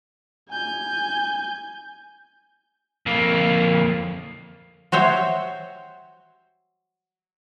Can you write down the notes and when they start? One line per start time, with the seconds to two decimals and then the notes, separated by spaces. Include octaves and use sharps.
0.49 G#5 G6
3.06 F2 A#3
4.92 F#4 C5 C#5 E5 G5